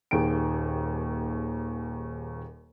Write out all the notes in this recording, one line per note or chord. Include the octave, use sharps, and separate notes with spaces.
D#1 D#2 D#3 G#4 G5 D7